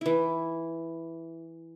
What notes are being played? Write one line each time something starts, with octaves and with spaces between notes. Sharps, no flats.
E3 E4